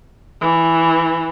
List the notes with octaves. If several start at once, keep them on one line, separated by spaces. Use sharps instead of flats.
E3